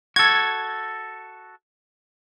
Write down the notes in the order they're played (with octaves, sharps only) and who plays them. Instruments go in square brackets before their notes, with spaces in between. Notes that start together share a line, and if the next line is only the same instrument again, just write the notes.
[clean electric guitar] F#4 A4 [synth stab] G#6